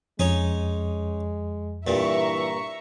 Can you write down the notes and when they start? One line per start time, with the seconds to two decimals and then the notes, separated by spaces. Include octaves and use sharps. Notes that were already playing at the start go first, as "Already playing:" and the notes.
0.19 F2 G#3 C#4 D#4 C#5
1.87 G2 A#2 E3 E5 A#5 C#6